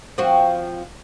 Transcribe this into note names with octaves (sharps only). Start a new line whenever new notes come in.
F3 C4 F#4